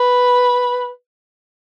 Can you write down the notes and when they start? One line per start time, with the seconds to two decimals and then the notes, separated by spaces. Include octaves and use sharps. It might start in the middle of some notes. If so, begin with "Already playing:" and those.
Already playing: B4